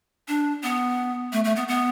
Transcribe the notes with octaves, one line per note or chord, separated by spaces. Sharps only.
D4
B3
A3
A3
B3
B3